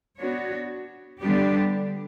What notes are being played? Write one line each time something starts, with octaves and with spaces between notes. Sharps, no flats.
B3 D4 F#4 C#5
D3 G3 B3 D4 G4